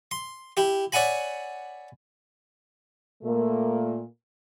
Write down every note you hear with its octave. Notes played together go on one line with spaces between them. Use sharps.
C6
E4 G4
C#5 D5 E5 F#5 G#5 B5
A#2 A3 A#3